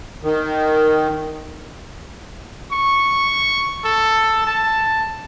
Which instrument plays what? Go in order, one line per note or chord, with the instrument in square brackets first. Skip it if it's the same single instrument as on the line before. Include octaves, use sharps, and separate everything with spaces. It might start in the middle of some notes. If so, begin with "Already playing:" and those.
[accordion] D#3
[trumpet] C#6
A4
A5